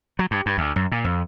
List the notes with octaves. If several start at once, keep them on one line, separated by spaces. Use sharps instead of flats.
F#3
G2
G2
D2
F#2
A#2
F2